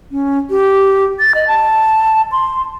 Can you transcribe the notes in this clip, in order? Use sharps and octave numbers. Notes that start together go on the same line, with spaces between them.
C#4
G4
A6
D#5
A5
C6